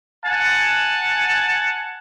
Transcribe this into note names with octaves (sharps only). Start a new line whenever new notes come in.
F#5 G#5 A5